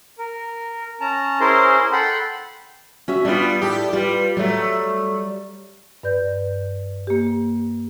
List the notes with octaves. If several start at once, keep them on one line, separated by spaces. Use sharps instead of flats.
A#4
C#4 A5 A#5
C#4 E4 G#4 A#4 C5 C6
A4 F#5 G5 B5 C6
C#4 F#4 E5
G3 B3 D4 F4
E4 G4 A4 D5
G3 F4 G4 B4
F#3 G3 A3
G2 B4 D5 G6
A#3 G4